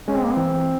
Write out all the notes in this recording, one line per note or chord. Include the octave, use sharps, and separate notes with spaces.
G#3 C#4
C4
A#3
E3 C4